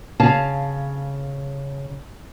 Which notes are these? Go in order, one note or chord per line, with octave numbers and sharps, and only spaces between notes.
C#3 F5 A5